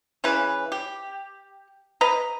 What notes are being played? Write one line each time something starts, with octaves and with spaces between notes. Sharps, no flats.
C#3 E3 C#4 B4
G4
B4 D#5 A#5